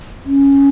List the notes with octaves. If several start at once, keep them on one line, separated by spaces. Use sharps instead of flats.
C#4